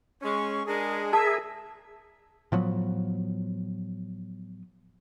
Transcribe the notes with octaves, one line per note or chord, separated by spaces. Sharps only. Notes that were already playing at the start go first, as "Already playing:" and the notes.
G#3 C#4 C#6
G#3 D4 G#4 A#4
G#4 A#4 E5 A5
A2 F3 F#3 B3